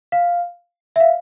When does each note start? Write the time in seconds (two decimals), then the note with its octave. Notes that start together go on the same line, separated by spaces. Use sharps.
0.12 F5
0.96 E5
1.00 F5